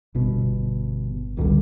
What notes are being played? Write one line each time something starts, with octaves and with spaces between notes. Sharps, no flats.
G1 B2
G1 C#2 G2 D3